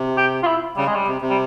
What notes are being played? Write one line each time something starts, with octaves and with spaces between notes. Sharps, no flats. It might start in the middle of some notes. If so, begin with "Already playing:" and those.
Already playing: C3
G4
F4
E4
C#3 G3
G#3
G3
C3
C3
G3